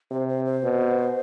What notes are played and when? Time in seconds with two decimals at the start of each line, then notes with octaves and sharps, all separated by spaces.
0.11 C3 C5
0.29 C5
0.45 C5
0.63 B2